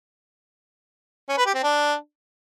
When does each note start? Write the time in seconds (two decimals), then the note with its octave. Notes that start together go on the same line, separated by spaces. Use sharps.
1.29 C#4
1.37 B4
1.46 G4
1.55 C4
1.63 D4